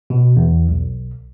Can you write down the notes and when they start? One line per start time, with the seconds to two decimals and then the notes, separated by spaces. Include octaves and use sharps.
0.10 B2
0.36 E2
0.69 B1